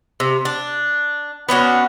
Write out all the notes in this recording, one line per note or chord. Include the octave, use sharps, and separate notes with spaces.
C3
D4
B3 C#4 D4 F#4